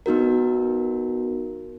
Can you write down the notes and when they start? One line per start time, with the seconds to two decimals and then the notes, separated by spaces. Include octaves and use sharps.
0.06 B3 D#4 F#4 A#4